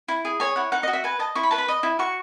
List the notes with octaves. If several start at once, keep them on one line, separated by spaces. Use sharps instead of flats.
E4
G#4
C#5 G#5
E4 F#5
D#4 F#5
D#5
F#4
E5
B4 G#5
D#5 A5
E4 C#6
B5
B4 A5
B5
D#5
E4
F#4 C#6